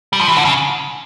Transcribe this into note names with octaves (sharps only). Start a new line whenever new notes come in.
G3
F3
E3
D3
C#3